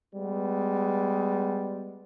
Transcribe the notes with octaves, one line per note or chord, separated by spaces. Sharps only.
G3 G#3 B3